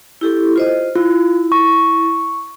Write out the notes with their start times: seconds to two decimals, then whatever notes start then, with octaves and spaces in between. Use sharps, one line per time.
0.21 E4 G4 A4
0.56 F4 C5 D#5
0.95 E4 F4
1.52 C#6